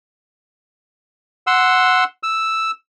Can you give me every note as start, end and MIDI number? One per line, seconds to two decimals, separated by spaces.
1.47 2.04 78
1.47 2.04 84
1.47 2.04 88
2.23 2.71 88